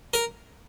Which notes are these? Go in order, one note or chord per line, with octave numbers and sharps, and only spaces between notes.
A#4